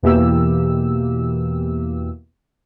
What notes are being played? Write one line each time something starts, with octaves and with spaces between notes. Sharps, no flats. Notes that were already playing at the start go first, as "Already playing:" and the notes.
E2 B2 E3 A#3 G4 E6